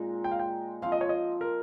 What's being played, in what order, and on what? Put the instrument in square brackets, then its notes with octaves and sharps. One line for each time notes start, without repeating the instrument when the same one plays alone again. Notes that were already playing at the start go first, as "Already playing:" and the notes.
Already playing: [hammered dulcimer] A#2 G#3 C4 D#4
[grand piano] G5
F5
G5
[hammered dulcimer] F3 C4 F4 [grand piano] F5
[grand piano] D#5
C#5
D#5
A#4